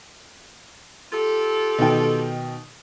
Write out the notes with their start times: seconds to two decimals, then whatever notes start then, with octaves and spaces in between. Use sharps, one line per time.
1.12 F4 G4 A4
1.78 B2 D#3 G5